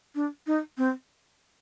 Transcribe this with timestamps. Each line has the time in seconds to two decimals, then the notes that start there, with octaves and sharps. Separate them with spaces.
0.15 D4
0.47 D#4
0.78 C4